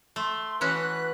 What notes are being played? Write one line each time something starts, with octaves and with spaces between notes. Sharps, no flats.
A3 C6
E3 C#4 F#4 B4 F#6